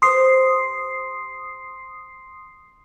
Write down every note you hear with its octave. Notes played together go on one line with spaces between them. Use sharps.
G4 B4 C5 C6 D#6 C7